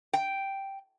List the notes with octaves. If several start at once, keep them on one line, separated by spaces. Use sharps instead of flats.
G5